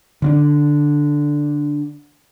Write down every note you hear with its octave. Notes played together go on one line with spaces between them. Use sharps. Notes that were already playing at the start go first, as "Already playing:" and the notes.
D3 C#4 D4